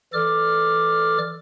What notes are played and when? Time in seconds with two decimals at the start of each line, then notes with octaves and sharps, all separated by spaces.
0.13 E3 A4 D5 D6 F6